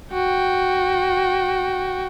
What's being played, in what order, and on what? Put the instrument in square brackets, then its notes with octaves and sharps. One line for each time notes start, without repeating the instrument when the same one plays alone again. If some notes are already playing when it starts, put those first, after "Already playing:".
[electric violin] F#4 G5